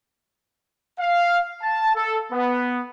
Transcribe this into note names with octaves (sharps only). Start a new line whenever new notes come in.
F5
A5
A4
B3